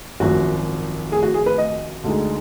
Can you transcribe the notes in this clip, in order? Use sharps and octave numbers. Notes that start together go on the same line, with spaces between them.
G#1 F#2 F3 F#4
G#4
F#4
G#4
B4
D#5
D2 D3 G#3 D#4